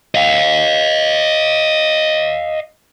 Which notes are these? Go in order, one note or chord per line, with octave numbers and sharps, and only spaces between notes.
D#5 F5